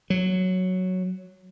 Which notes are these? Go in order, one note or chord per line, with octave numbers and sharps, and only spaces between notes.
F#3